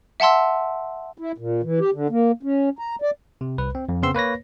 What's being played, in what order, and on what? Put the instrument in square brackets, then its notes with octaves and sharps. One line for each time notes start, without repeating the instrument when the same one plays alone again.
[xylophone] E5 F#5 A5 C6 E6
[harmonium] E4
A#2
E3
G4
D3
A#3
C#4
A#5
D5
[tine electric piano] C3
C2 B4
C4
F2
C#3 B3 C4 C6 E6
A#3 B4 C#5 A#6